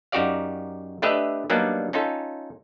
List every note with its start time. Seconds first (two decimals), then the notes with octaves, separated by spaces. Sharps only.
0.12 F#2 D#4 F#4 G4 D5 F5
1.02 A3 D4 G4 B4 D#5 E5
1.50 F#3 G3 A#3 B3 D4 D#4
1.93 C#4 D#4 F4 A4